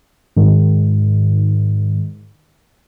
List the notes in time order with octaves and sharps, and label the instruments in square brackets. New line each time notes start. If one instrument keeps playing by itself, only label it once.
[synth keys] G#2 D#3